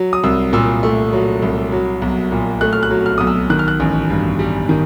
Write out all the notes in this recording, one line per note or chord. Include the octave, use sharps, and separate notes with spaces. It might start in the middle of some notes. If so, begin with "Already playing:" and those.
Already playing: F#3
D#6
C2 E6
A#2 E6
A3
F#3
C2
F#3
B1
A#2
A3 F#6
F6
F#6
F#3
F6
B1 D#6
E6
D#3 F#6
F6
F#6
A1
G2
G3
D#3